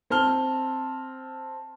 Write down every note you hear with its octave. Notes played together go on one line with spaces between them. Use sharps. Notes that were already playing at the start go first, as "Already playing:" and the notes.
C4 A5 F6 G7